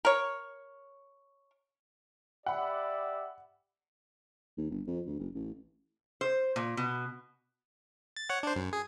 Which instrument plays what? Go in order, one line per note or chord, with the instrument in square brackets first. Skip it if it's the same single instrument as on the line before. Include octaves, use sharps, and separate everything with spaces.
[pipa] A#4 C#5
[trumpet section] G4 D5 E5 [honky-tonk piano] F#5 B5
[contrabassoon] D#2
G1
F2
D2
F#1
A1
[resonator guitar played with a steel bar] C5
A#2
B2
[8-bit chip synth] A6
C#5 F#5
D4 C5
F#2
G#4